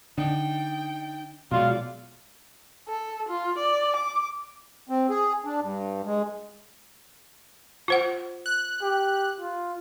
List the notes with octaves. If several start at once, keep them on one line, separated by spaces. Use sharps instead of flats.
D3 D4 D#4 G5
B2 F#3 G#3 F4 F#4 D5
A4
F4
D5
D6
C4
G#4
D4
G2
G#3
F4 C5 F#5
F#6
G4
F4